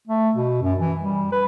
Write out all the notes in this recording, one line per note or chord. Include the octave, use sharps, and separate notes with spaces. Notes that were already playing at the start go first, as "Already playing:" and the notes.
A3
B2
F#2
E3
G3
B4